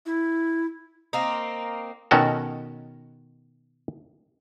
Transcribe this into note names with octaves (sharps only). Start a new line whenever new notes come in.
E4
A#3 C4 D#4
B2 D#3 C#4 F#4 A4